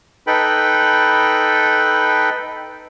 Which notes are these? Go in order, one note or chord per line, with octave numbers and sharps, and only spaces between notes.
D#4 A4 B4 G5 B5